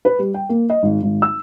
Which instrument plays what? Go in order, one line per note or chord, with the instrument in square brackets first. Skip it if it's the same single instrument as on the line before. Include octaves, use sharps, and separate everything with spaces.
[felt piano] B4
G3
G5
A#3
D#5
G#1
G#1
E6